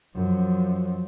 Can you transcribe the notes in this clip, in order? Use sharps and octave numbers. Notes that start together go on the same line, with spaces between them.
F#2 F3